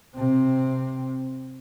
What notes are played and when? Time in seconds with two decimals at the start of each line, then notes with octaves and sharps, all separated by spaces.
0.16 C3 C4